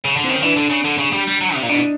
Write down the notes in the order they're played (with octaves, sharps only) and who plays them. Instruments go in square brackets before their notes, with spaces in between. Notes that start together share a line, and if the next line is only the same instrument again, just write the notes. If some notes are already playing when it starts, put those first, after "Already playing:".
[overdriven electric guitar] C#3
D3
[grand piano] C4
[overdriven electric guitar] D#3 [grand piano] C#4
[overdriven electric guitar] E3 [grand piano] D4
[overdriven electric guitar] D3
C#3
D3
C#3
G3
G3
F#3
C3
A#2
[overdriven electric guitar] B2 [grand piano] D4
[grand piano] D#4